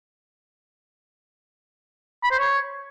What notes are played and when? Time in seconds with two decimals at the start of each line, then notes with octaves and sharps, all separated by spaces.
2.23 B5
2.31 C5
2.39 C#5